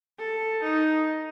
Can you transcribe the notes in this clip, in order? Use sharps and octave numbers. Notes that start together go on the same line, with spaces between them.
A4
D#4